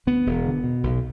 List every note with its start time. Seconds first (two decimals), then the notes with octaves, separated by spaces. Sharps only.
0.07 D2 B3
0.26 E1
0.45 D3
0.64 B2
0.83 B1